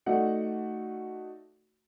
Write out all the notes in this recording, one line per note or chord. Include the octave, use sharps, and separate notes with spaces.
A3 D#4 F#4 D5 F#5